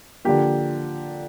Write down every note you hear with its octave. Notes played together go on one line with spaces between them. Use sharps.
D3 F3 A#3 G4